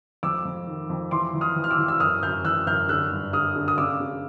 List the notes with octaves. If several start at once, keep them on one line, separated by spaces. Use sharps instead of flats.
F2 D6 E6
F2
D#3
F2
E3 C6 D6
E3
D#6 F6
E3
F6
D6 E6
E3
E6
F#2 D#6 F6
F#2 F6 G6
E3 E6 F#6
F#2 F6 G6
D3 E6 F#6
G2
D3 D#6 F6
D3
D#6
C#3 D6 E6
C#3